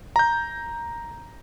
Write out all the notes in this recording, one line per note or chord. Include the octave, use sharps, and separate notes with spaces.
A#5 G6